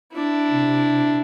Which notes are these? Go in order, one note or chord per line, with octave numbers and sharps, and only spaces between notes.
D4 E4
C3